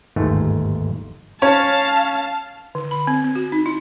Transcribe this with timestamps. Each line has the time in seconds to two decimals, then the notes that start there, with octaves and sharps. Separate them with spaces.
0.16 G1 D#2 G#2 A3
1.42 C#4 C#5 F5 A5
2.75 D3
2.91 B5
3.07 C4
3.24 C4
3.36 F#4
3.52 D#4
3.66 E4